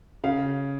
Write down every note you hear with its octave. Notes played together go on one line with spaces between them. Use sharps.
C#3 F5